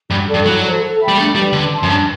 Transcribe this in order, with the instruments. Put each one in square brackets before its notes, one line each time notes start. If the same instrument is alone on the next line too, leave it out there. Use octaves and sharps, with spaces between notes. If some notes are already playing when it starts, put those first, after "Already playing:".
[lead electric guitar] G2 [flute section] F#4
[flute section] A4 D5
[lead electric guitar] G2
[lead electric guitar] F#3 [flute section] E4
[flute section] A4 C5
A4
E5 G5 B5
[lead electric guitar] G3
[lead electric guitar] A3 [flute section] D4
[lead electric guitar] G3 [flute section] G4 B4 D5
[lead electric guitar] D3 [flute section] B4
[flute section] E5 A5 C6
[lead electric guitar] F#2
[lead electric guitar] G2 [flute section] D4